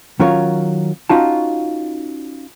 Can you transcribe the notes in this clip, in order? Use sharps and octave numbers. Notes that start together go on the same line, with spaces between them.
D#3 F#3 C#4 F4 A#4 C#5
C#4 D#4 F4 F#4 A5